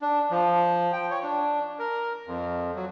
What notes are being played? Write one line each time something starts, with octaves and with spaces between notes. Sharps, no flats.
D4
F3
G5
C#5
D4
A#4
F2
F#3